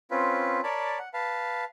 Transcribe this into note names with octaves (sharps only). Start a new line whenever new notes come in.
C4 C#4 F4 B4
A#4 C#5 D5 A5 B5
F#5
B4 F5 A5